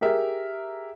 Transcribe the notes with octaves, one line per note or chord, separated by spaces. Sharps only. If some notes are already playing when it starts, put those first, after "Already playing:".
G4 G#4 A#4 E5